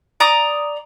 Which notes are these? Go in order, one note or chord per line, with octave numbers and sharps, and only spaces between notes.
D5 A#5 D#6